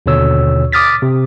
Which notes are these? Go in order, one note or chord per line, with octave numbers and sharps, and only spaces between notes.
D#2 B2 D3 C#5 E6
D6 D#6 F6 A6 B6
C3